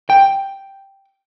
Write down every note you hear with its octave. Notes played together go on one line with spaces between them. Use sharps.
G5